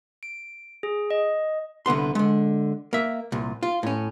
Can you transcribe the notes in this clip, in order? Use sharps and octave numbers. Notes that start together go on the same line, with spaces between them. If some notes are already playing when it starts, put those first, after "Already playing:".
D7
G#4
D#5
C2 D3 B3 C6
D3 G#3
A#3 E5
C2 A#2
F4
A2 C#4